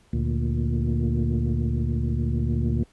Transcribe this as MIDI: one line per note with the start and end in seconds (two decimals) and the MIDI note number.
0.13 2.83 38
0.13 2.83 46